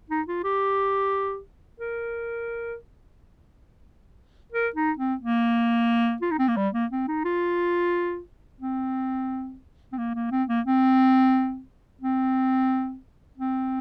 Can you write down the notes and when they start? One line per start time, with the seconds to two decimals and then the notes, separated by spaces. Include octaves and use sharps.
0.10 D#4
0.28 F4
0.44 G4
1.80 A#4
4.52 A#4
4.76 D#4
4.98 C4
5.21 A#3
6.22 F4
6.31 D#4
6.39 C4
6.48 A#3
6.57 G3
6.74 A#3
6.92 C4
7.08 D#4
7.24 F4
8.61 C4
9.92 C4
9.98 A#3
10.15 A#3
10.31 C4
10.49 A#3
10.66 C4
12.01 C4
13.37 C4